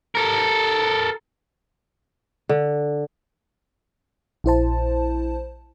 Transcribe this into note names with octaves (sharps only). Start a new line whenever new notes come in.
A4 A#4
D3
A#1 E4 C5 A5